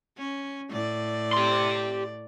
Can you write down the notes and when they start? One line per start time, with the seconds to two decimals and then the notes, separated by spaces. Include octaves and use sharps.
0.17 C#4
0.70 A2 D5
1.33 G4 C6